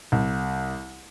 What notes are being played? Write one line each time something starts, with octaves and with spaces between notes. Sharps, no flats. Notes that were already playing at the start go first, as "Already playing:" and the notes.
C2